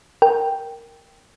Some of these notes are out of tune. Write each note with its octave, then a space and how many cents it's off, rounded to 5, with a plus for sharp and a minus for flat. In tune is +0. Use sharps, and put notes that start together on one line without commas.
A#4 +0 G5 +0